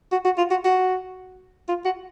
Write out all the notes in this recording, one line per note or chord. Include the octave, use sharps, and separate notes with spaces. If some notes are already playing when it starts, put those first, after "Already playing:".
F#4
F#4
F4
F#4
F#4
F4
F#4